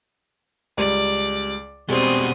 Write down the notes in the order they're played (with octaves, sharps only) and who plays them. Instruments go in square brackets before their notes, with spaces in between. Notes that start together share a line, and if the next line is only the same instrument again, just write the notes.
[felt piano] C#2 G3 [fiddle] D5
[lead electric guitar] B2 G#3 [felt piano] G3 G#4 [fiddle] C4 D#6